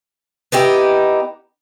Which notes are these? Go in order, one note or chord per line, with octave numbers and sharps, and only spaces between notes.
B3 D#4 E4 G4